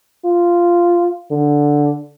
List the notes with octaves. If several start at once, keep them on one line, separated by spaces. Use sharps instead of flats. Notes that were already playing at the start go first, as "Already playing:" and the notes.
F4
D3